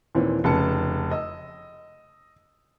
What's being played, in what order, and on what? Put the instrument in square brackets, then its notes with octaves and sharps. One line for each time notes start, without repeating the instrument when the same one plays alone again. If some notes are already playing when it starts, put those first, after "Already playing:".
[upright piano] D#2 A#2 E3 C4
F1 C#3 A5 C#7
D#5 E6